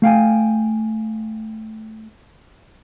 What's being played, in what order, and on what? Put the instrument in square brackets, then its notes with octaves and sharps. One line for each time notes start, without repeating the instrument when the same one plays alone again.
[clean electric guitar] A3 F5 G5 G#5